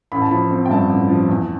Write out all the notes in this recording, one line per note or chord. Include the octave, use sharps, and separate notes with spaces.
A1 B5
A5
F3 B5
C4
G5
G2 A5
A1
F3
E2